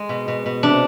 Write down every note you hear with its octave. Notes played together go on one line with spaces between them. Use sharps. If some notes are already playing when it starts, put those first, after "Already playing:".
Already playing: G#3
B2
B2
B2
C3 D4